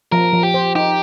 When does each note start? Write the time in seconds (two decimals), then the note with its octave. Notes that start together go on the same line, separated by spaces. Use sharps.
0.12 F3 A#4
0.33 F3
0.43 G4
0.54 C5
0.75 D#4 G4